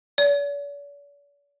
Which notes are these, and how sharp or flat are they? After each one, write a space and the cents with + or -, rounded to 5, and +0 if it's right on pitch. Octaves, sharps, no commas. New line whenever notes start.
D5 -45